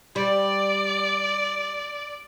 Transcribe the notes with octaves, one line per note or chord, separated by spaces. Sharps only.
G3 D5